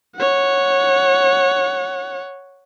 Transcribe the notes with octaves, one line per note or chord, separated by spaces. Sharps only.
C#5 F#5